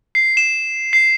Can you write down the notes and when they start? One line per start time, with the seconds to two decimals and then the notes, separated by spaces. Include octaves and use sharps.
0.15 C7
0.37 E7
0.93 C7